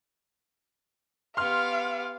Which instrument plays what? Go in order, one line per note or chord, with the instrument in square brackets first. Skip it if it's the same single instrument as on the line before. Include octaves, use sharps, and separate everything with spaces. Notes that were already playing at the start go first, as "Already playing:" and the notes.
[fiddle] B3 G4 [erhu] F5 [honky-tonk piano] C6 F6